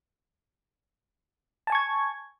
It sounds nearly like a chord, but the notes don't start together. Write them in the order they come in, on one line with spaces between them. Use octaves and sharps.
A5 G#5 C#6 G#6